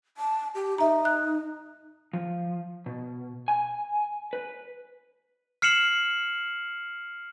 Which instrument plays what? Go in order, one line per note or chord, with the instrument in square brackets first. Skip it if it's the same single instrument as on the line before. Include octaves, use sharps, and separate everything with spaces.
[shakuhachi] A5
G4
[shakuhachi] D#4 [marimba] E5 A#5
[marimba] F#6
[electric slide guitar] F3
B2
G#5
B4
[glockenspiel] F6 C7 C#7 E7 F#7